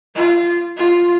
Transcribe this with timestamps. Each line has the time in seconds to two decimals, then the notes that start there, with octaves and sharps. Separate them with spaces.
0.15 F4
0.77 F4